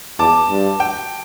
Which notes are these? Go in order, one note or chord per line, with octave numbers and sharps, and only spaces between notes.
E2 A5 D6
G2
G5